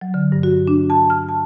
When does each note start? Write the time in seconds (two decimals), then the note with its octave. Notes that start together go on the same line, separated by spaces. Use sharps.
0.01 F#3
0.14 D3
0.32 G2
0.43 F#4
0.67 D4
0.90 A5
1.10 F6
1.29 A5